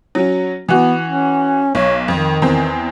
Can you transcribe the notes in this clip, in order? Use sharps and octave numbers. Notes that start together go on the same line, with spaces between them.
F#3 C#4
E3 B3 F#4
C#4
B1 C#5
F2 D#3
E2 C4